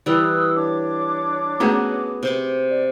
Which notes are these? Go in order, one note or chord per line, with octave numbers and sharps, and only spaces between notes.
E3 G3 D#6 E6 F#6
D4 C#5 D6
A3 B3 C#4 F#4 G#4
C3 C5 D6
D5